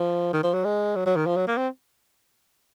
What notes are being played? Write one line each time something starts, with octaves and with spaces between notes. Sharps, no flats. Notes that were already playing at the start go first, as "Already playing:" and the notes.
Already playing: F3
D#3
F3
F#3
G#3
F#3
F#3
D#3
F3
F#3
A#3
C4